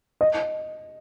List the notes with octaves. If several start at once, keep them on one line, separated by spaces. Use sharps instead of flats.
D#5